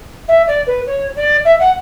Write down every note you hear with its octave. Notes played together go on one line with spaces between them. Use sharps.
E5
D5
B4
C#5
D5
E5
F#5